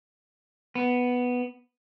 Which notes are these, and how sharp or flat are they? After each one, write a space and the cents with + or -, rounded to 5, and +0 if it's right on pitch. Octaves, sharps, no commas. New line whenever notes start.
B3 +0